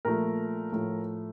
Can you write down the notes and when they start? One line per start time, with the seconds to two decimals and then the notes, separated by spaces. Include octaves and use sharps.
0.05 A#2 F3 A3 A#4
0.72 A2 F3 A3